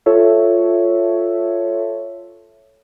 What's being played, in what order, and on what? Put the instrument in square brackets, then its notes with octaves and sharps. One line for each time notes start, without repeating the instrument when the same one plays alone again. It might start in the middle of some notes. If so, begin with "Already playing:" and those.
[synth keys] F4 A4 C#5 E5